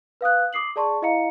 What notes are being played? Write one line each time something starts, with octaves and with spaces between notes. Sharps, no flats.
B4 F5 D#6 F#6
D6 D#6 C7 F#7
G#4 D5 A5 C6 C#6
E4 D#5 F5 A#5 C#7